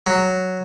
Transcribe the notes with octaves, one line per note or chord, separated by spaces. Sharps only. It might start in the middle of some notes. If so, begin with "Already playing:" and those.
F#3